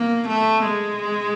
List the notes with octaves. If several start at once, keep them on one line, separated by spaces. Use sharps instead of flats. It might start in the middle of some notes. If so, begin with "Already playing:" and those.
Already playing: A#3
A3
G#3